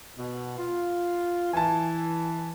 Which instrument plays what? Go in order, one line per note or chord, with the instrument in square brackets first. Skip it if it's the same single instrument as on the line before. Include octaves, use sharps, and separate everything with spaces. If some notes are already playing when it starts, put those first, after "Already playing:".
[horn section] B2
F4
[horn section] E3 [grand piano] G#5 A5